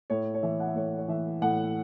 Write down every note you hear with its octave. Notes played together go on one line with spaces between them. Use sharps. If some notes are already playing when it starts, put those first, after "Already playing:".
A2 C#5
C#5
E3 E5
F#5
E5
A2 C#5
C#5
E3 E5
A2 F#5